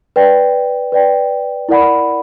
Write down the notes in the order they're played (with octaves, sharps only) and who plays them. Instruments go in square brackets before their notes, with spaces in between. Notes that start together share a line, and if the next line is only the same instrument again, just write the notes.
[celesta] B4 D5 G5
B4 D5 G5
E4 A#4 D5 F#5 B5